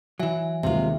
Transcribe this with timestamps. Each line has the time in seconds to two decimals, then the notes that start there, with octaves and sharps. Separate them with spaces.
0.19 E3 F#3 E5 G#5
0.63 D#2 C3 D#3 G#3 F4 E5